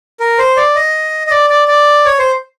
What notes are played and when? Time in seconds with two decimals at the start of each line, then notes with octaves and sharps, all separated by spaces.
0.20 A#4
0.38 C5
0.57 D5
0.75 D#5
1.27 D#5
1.31 D5
1.50 D5
1.68 D5
2.05 C#5
2.19 C5